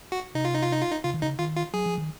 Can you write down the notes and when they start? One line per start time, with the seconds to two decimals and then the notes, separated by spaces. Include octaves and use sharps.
0.12 F#4
0.35 C3 D#4
0.45 F4
0.54 D#4
0.63 F4
0.72 D#4
0.82 F4
0.91 D#4
1.04 C#3 F4
1.14 D#3
1.21 C#3 D#4
1.39 D#3 F4
1.57 F4
1.73 F#3 G#4
1.86 F3
1.98 D#3